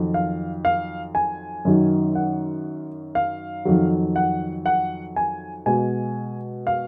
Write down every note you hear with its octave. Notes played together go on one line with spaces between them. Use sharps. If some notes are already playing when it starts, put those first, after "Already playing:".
Already playing: F2 D#3 F#3
F5
F5
G#5
F#2 D#3 F#3
F#5
F5
F2 D#3 F#3
F#5
F#5
G#5
B2 G#3 G#5
F5